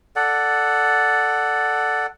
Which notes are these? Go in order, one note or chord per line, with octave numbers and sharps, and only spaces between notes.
A4 D5 F#5